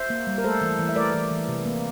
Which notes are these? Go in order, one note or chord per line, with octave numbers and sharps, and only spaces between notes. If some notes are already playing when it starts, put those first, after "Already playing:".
Already playing: C5 E5
A#3
G3
A#4
A3 A4 C5
E3
E3
E5
A3 A#4 D5
E3
E3
C3
A#3